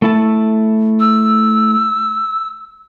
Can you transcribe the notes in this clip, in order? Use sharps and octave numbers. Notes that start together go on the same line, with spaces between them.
A3 E4 A5
E6